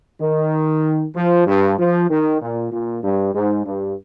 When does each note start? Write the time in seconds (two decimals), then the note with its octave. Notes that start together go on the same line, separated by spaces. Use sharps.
0.21 D#3
1.15 F3
1.46 G2
1.78 F3
2.10 D#3
2.41 A#2
2.71 A#2
3.03 G2
3.35 G#2
3.65 G2